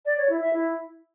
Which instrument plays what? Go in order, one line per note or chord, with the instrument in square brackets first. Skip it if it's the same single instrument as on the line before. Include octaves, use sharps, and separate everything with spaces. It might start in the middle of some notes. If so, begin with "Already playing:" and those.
[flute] D5
C#5
E4
E5
E4